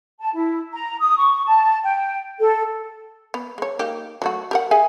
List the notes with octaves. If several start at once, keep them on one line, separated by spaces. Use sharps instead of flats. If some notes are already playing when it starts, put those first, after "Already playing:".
A5
E4
A#5
D#6
C#6
A5
G5
A4
B3
G#3 C#5
A#3 D#4 G4
F#3 A3 F#4
G4 A#4 F#5
G#4 E5 G#5